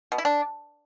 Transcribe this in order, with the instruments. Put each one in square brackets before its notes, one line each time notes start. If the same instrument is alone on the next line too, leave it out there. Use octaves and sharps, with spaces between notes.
[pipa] B2
E4
D4